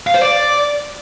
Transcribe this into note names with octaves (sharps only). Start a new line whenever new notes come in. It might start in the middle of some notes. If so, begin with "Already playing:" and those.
F5
C5
D5